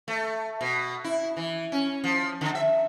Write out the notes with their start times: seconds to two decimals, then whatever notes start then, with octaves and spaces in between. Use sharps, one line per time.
0.08 A3
0.61 B2
1.04 E4
1.37 E3
1.72 C#4
2.04 F3
2.41 D3
2.55 E5